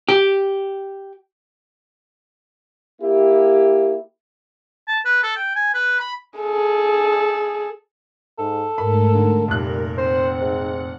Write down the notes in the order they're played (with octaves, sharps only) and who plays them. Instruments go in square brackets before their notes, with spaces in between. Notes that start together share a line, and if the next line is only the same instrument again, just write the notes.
[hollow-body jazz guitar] G4
[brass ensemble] A#3 E4 G4
[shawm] A5
B4
A4
G5
G#5
B4
B5
[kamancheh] G#4 A4
[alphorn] G#2 [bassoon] A4
[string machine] G#2 A3 [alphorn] A#4 [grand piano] B5
[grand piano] D3
[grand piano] F1 A#2 F#6 [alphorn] G3 [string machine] A#4
[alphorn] C4 [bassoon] C5 [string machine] F#5
[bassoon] G#2